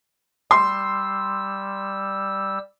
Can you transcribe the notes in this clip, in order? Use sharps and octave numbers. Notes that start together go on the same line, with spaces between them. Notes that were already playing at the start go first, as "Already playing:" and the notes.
G3 C6 E6